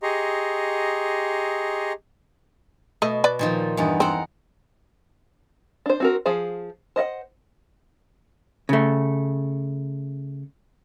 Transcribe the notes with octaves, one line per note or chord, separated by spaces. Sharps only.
G4 G#4 D#5 A#5 C6 C#6
B2 A3 D#5
B4 D5
A#2 D#3 F3
E2 G2 D#4
C4 A#4 F#5
D4 C5
C4 F#4 A#4
F3 G#4 C5 F5
C5 D#5 F5 F#5
C#3 A3